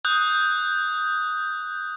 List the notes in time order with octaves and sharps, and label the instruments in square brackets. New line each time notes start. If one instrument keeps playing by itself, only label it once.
[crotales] D#6 F#6 G6